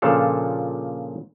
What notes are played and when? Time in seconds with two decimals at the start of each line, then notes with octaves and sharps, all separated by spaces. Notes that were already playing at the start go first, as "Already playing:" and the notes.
0.02 A#2 C#3 F3 D4 A4 F5